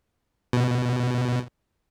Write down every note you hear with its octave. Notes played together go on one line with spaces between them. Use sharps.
B2